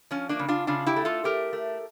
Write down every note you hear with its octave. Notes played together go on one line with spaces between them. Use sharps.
F3 C#4
A#3 D4
C#3
D4 F4
C#3 D4 F4
E4 G4
A3
F4 A4
A3 G4 A#4
A3